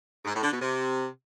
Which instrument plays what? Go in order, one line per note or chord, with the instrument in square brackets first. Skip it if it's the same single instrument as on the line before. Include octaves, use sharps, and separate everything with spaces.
[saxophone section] G#2
A2
D3
B2
C3